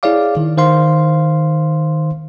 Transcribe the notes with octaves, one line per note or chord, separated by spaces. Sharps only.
E4 G#4 C#5 D5 F5 D6
D#3
D#3 C5 F5 C6